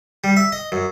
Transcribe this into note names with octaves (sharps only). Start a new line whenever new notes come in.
G3
E5
D#5
F#2